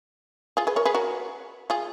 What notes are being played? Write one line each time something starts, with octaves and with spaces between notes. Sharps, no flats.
F4 G#4
G#4 B4
A#4 C#5
G#4 B4
F#4 A#4
F4 G#4